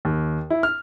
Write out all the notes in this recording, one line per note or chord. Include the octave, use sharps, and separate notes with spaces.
D#2
E4
F6